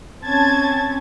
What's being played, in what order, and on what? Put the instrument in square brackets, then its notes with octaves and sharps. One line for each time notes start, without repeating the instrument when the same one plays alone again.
[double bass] C4 C#4 [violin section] A5 G#6 A6